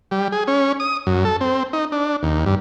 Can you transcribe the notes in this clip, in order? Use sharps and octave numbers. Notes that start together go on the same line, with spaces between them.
G3
G#4
C#4
D#6
F#2
A4
C4
D#4
D4
D#2
G2